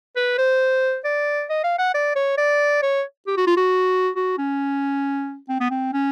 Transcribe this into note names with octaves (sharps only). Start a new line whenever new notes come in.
B4
C5
D5
D#5
F5
F#5
D5
C#5
D5
C#5
G4
F#4
F4
F#4
F#4
C#4
C4
B3
C4
C#4